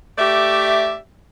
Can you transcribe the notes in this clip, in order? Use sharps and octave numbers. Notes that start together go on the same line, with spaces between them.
A3 G4 D5 E5